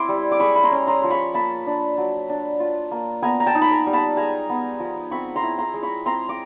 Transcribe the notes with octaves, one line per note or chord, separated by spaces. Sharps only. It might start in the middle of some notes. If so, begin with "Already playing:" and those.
Already playing: C4 E4 C6 D6
G3
D6
G#3 B5 C#6
B5
A#5 C6
C#4
A#5 C6
F3 C6
B5 C#6
A#3 A5 B5
D4
F#3
D4
F4
A#3
B3 G#5 A#5
A#5
G5 A5
D#4
B5
G#5 A#5
G3
A5 B5
G#3 G#5 A#5
B3
F3
C4 B5 C#6
A#5 C6
E4
A#5 C6
G#3
B5 C#6
C4 A#5 C6
D6